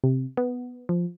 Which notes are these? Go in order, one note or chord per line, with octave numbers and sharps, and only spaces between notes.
C3
B3
F3